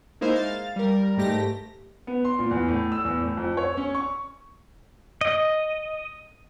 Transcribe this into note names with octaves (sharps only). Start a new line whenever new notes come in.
G#3 A#3 D#4 E4 A#4 C5
F5 A6
G3 A#4
G#2 A3 G4 A#6
B3
C6
A#2
E2
A2
E6
E2
A2
F2
C#5
C#4
C#6
D#5